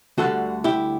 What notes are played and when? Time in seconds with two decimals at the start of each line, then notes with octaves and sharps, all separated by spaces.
0.18 D2 D3 G3 F#4 A4
0.64 E4 G4